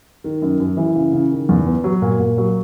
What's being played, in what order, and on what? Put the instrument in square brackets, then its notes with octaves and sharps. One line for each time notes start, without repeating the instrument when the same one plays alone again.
[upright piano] D#3
F#2
F#2
E3
C#3
C#3
D#3
E2
B3
F#3
A#2
A#2
F#3